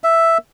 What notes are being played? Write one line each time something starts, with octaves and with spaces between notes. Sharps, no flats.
E5